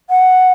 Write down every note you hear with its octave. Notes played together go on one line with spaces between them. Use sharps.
F#5